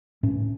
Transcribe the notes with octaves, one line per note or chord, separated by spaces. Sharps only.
A2 C#4